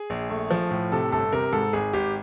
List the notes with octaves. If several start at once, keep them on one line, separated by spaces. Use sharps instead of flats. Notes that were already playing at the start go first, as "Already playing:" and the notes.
Already playing: G#4
A#1
A3
F3
A2
C3 A4
G1 A4
C3 A#4
G#2 A4
G#1 G#4
G#1 G4